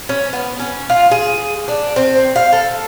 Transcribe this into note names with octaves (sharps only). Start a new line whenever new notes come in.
C#4
B3
C#4
F4
G#4
D4
C4
F5
A4